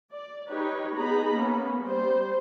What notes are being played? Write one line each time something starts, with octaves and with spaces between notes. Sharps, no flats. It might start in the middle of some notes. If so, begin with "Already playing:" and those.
D5
D#4 G4 B4 C#5
B3 D#4 G#4 A#5 B5
A#3 B3 C#4
G3 C5